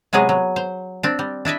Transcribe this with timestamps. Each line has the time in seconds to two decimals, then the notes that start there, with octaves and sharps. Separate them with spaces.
0.13 C3 F#3 G#3 B3 G#4
0.29 F#3
0.56 C5
1.03 C4 D4
1.19 G3
1.45 D4 E4 D#5 E5